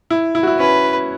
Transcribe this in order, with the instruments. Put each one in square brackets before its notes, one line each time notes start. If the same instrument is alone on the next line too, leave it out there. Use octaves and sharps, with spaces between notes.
[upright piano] E4
E4
F#4
E4
[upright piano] C#4 [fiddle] B4